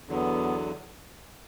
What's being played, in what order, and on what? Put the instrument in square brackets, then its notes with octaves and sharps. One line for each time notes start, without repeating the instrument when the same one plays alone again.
[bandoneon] E2 D3 F#3 [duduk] B3